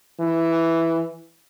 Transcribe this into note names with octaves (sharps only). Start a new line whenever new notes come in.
E3